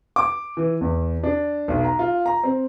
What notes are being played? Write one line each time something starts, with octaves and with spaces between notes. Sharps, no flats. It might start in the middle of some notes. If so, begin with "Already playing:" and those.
D6
E3
E2
D4
B1
A#5
F4
A#5
C4